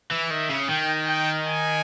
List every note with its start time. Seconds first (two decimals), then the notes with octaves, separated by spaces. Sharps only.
0.11 E3
0.30 D#3 E5
0.49 C#3
0.68 D#3 G5
1.06 G5
1.45 G#5